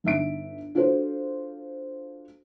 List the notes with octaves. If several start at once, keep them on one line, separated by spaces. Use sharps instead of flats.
G1 D#4 E5 D7
D4 F4 F#4 A4 C5